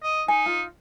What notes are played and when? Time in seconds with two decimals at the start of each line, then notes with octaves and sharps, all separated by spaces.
0.03 D#5
0.28 D#4 G#5
0.46 F4